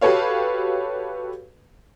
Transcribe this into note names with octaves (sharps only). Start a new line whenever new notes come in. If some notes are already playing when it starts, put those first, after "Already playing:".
F#4 G4 A4 B4 C#5 F5